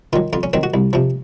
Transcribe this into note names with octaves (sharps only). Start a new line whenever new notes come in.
D#3 F#3 F4
F2 F4
C#4
D#3 F#3 C4
F#4
C2
C3 F3